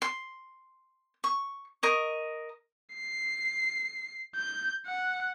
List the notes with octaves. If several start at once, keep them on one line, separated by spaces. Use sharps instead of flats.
C6
C#6
A#4 D#5 C#6
C7
G6
F#5